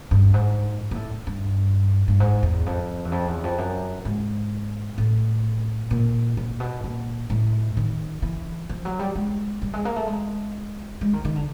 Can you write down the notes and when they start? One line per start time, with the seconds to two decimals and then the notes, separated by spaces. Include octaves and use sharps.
0.11 G2
0.34 G#2
0.91 A#2
0.95 A2
1.27 G2
2.08 G2
2.20 G#2
2.43 E2
2.66 F2
3.05 E2
3.12 F2
3.28 E2
3.43 F2
3.58 F#2
4.05 G#2
4.98 A2
5.91 A#2
6.37 A#2
6.60 B2
6.84 A#2
7.30 A2
7.77 D#3
8.22 E3
8.70 F3
8.85 F#3
8.99 G3
9.16 G#3
9.62 G3
9.73 G#3
9.85 A#3
9.96 A3
10.08 G#3
11.01 G#3
11.13 D#3
11.25 D#3
11.36 D3